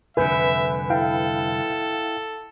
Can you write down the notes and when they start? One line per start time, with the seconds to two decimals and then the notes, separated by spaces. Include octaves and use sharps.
0.17 C2 F2 D3 B4 E5 G#5 G6
0.90 E4 A4 F5 G5